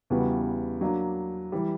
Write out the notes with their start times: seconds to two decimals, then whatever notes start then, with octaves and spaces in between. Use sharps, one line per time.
0.10 E2 C#3 G3 B3 F#4
0.81 F#3 A#3 D4
1.52 E3 G3